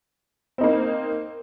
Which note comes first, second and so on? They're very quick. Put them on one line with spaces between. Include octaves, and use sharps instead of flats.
C4 D#4 A#3